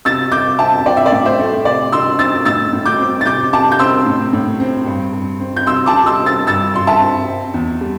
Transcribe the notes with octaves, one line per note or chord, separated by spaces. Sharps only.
C3 E6 A6
C3 D6 G6
C4 E5 A5
C4 D5 G5
E5
D5
A2
C5 E5
A3
C3 D5
C3 C6 E6
C4 E6 A6
A2 E6 A6
A2
D6 G6
C4
A6
C3 D6 G6
C3 A5 D6
G6
C4 C6 E6
A2
A2
C4
G2
G2
C4
G6
C3 C6 E6
A5 D6
C3
C6 E6
C4
E6 A6
G2 E6 A6
G2 C6
E5 A5
C4
C4
E2
G3